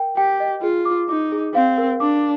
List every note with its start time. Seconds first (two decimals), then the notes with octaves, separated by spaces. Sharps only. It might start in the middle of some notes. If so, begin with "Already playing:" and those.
Already playing: A#4 G5
0.17 G4 G5
0.40 D#5
0.62 F4 G#4
0.85 D6
1.09 D#4 D6
1.32 G#4
1.55 C4 F5
1.78 A#4
2.00 D4 D6